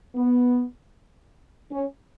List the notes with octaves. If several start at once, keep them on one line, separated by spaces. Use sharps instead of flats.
B3
C#4